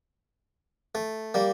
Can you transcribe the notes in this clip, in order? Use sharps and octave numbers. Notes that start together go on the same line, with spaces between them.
A3
G3 A#3